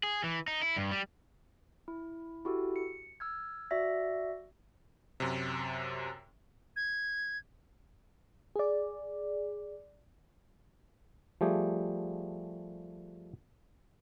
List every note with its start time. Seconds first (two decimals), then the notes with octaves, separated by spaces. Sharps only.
0.03 G#4
0.24 E3
0.48 D#4
0.62 E4
0.76 G2
0.91 G3
1.88 E4
2.45 E4 F#4 G4 A4
2.76 C#7
3.20 E6 F6 G#6
3.71 F#4 D5 E5 A#6
5.20 F#2 C3
6.76 G#6
8.56 G#4 D5
11.41 F3 G3 A3 G4 G#4